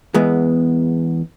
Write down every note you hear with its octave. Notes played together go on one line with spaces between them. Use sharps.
E2 G#3 B3